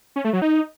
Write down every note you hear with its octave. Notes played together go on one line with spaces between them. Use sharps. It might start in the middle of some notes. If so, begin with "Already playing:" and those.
C#4
A3
F#3
D#4